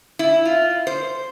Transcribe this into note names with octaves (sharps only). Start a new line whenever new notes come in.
E4
F4
C5